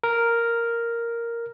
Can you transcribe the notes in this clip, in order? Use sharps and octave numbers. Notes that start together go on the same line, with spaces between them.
A#4